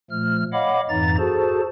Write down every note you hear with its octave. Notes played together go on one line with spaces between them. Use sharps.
A#2 F3 A3 F6
C#5 D#5 F5 F#5 B5 D6
F2 G#2 E3 D#4 A#5 A6
F#4 G#4 A4 C5 A5